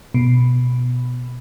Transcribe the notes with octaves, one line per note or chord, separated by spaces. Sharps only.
B2